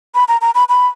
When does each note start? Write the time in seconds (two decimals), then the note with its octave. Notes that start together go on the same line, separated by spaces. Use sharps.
0.15 B5
0.28 A#5
0.41 A#5
0.55 B5
0.69 B5